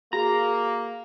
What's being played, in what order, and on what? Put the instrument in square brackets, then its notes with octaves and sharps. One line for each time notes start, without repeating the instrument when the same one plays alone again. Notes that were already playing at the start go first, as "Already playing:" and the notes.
[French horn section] A#3 [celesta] F#4 G#4 [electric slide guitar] A#5